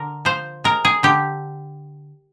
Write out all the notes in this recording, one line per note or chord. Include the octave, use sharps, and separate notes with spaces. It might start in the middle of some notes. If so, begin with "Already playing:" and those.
Already playing: D3 A#4
F3 C5
G#3 A#4
G#4
D3 G4